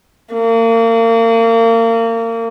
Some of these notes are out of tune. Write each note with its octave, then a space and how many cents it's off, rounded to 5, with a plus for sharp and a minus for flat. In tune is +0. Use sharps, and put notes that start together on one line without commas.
A#3 -35